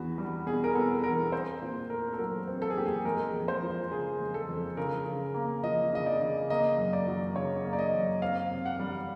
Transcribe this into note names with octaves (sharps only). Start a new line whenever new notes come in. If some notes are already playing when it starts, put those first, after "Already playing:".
Already playing: E2 B3 F#4
G3
B2 G#4
A#4
B3 A4
E2 A#4
C4 C5
A#2
A3 A#4
A4
F#3 A#4
C4
A4
G#4
A#2 G4
G#4
G#3 A#4
F2
C5
F3
C#3 G#4
G#3
A4
F2
C#3 A#4
C#3
A#3
F3 D#5
C#3 D#5
D5
C#3
A#3 D#5
F#2
D5
F#3
C#3 C#5
A#3
D5
D#5
F#2
C4 F5
C3
F#5
G3